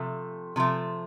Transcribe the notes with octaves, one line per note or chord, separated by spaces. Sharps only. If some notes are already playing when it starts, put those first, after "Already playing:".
Already playing: C3 F3 A3
C3 F3 A3